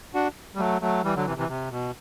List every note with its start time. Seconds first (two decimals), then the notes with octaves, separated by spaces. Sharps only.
0.14 D4 F#4
0.56 G3
0.59 F#3 A3
0.81 F#3 A3
1.04 E3 G3
1.16 D3 F#3
1.26 C3 E3
1.38 C3 E3
1.49 C3
1.71 B2